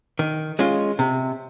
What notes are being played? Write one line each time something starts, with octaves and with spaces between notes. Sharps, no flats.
D#3
G#3 C#4 F4
C3